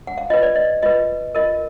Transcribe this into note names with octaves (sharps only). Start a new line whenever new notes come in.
F#5
F5
F4 B4 D#5
D5
D#5
F4 B4 D#5
F4 A#4 D#5